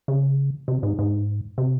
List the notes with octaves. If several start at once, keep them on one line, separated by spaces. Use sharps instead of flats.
C#3
C3
G#2
G#2
C3